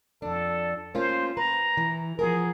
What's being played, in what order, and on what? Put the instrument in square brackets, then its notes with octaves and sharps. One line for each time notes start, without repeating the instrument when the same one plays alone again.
[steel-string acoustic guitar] F2 D4 [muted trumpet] A4
[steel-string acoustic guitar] A#3 C#4 F4 [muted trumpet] C5
[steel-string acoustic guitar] B4 [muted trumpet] A#5
[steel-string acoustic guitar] E3
[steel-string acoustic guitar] F3 B3 A#4 [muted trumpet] G#4